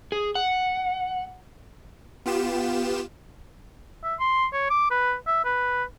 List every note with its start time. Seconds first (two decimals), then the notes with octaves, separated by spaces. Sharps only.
0.12 G#4
0.35 F#5
2.26 B3 F4 G4 E7
4.04 E5
4.20 C6
4.53 C#5
4.70 D6
4.91 B4
5.27 E5
5.45 B4